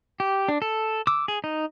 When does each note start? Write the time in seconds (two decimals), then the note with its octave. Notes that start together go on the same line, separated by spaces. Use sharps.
0.20 G4
0.48 D4
0.62 A4
1.07 D6 E6
1.28 G#4
1.44 D#4